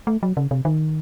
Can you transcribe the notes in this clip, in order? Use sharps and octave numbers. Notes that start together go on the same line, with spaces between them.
A3
F#3
C#3
C3
D#3